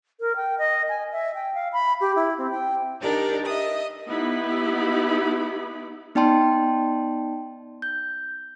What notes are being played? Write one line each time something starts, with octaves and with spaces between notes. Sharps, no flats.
A#4
G5
D#5
G#5
E5
G5
F5
B5
G4
E4
C4
G5
D4 D#4 G4 A#4 D5
D#5 E5 D#6
B3 D#4 E4 G4 B5
B3 D#4 D5 G5 A5 C6
G6